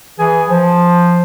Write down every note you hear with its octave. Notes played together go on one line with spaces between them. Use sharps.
E3 G#4 G#5
F3